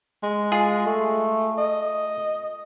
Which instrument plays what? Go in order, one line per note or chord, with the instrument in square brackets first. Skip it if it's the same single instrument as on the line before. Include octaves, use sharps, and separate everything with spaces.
[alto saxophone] G#3
[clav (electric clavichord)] F4 G#4
[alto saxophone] A3
D#5